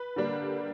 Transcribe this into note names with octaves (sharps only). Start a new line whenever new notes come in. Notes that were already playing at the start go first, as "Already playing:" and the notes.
Already playing: B4
D3 G3 A#3 D4